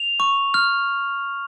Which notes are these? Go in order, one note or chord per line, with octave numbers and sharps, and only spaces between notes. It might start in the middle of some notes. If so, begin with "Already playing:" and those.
Already playing: F7
C#6
F6